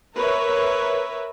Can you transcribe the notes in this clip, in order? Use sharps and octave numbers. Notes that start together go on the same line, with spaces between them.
A#4 B4 C#5 E5